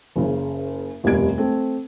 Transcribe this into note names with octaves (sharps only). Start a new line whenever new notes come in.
F#1 C#3
F1 D#2 B2 G3 G#6 D7
A3 C4